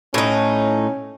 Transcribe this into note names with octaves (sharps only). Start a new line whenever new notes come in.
A2 C#4 D#4